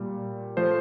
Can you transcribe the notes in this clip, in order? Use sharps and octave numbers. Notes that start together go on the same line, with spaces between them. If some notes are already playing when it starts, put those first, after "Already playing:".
Already playing: A#2 G3
F3 A3 C5